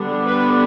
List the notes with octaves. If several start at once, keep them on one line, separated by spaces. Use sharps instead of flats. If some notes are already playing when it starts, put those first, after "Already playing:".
Already playing: D3 G3 B3 D4
B4